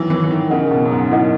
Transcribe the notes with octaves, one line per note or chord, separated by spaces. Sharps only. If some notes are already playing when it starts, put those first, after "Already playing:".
Already playing: D#3 E3 F#3
E3
E3
D#3
C#3 E4 A#4 D#5 F#5
B2
F#2
G#2
F#2 E4 A#4 D#5 F#5